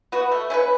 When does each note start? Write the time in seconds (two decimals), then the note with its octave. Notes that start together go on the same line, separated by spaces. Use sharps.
0.12 B3 F#4
0.32 A3
0.50 C#4 E4 B4